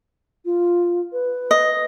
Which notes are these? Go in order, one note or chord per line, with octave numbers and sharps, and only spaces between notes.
F4
B4
D#5